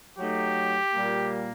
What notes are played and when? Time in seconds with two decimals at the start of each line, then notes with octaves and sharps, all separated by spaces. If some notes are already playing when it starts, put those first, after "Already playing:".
0.19 F#3 A3 D#4 G4
0.94 A#2 G3 A#3